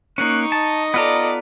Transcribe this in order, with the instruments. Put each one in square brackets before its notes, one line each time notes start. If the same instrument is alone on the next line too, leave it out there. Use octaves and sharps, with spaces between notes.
[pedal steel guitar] A#3 C#4 [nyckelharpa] D#4 C#6 [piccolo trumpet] F#6
[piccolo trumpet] D#5 [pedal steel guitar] A5
[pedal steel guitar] B3 F4 A#5 [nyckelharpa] A4 D5